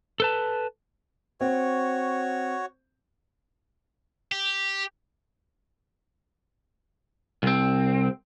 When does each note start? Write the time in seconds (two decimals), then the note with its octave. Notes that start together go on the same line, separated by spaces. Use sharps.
0.20 A4 B4 A5
1.41 C4 F#4 C#5
4.32 G4
7.43 C2 C4